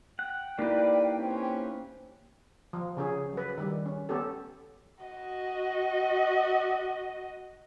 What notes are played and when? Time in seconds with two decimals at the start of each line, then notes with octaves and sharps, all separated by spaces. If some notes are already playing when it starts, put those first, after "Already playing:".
0.19 F#5 G5
0.59 A#3 D#4 E4 G4 B4 D5
1.18 C4 C#4 C5
2.73 F3
2.97 C#3 C#4 G#4
3.33 F#3 B4
3.58 D#3 G3
3.86 C#4
4.09 B3 C#4 G4 A4
5.04 F#4 D#5